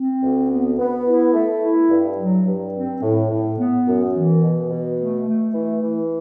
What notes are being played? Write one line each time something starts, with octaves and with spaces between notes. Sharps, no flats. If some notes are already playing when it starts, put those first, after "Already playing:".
Already playing: C4
D2
B3
B3
E4
A3
E4
G2
F#3
G2
C4
A2
A2
B3
F#2
E3
B2
B2
A3
A3
E3
E3